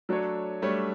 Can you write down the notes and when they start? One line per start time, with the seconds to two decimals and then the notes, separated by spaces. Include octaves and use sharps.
0.09 F#3 A3 D4 A4 C#5
0.62 G3 A3 D4 A4 C#5